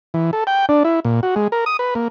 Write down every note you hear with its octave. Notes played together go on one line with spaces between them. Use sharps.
E3
A4
G5
D4
E4
A#2
F#4
G#3
A#4
D#6
B4
A#3